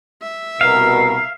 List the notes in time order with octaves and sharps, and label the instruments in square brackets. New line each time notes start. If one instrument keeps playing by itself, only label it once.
[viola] E5
[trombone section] C2 B2 [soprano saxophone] A#4 [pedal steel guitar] F5